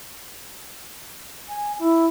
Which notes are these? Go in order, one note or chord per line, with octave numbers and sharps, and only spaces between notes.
G#5
E4